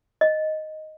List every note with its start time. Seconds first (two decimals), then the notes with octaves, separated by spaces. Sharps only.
0.21 D#5